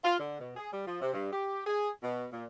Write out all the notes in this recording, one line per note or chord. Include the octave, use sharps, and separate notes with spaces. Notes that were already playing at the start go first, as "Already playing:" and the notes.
F4
D3
B2
G#4
G3
F3
C3
G2
G4
G#4
B2
A#2